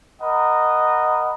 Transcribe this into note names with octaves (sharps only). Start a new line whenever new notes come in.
A#4 D#5 F#5 B5